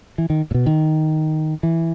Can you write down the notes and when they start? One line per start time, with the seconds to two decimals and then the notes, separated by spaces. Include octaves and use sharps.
0.18 E3
0.30 D#3
0.51 A2
0.54 B2
0.66 D#3
1.63 E3